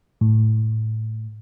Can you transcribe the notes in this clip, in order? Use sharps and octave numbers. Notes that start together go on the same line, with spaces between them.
A2